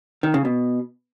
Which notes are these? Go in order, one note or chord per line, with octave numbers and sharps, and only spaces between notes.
D#3
C#3
B2